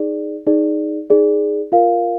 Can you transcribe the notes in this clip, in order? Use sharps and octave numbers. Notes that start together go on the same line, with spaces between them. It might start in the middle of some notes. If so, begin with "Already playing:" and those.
Already playing: D#4 G#4 D5
D#4 G#4 D5
D#4 G#4 D5
F4 A#4 F5